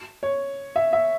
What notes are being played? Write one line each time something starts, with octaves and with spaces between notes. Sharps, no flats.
C#5
E5
E5